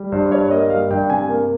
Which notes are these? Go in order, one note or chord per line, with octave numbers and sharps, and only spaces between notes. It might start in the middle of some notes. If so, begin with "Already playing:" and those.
Already playing: G3
G2 C5
G2 C#5
A#3 D#5
G3 F5
G2 G5
C3 G#5
A#3